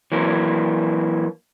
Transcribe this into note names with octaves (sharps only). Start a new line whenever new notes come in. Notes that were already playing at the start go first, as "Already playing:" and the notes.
E3 F#3 A#3